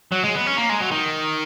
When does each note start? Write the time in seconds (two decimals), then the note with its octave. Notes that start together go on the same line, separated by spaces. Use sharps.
0.12 F#3
0.24 G#3
0.35 B3
0.46 C#4
0.57 A#3
0.69 G#3
0.81 F#3
0.91 D#3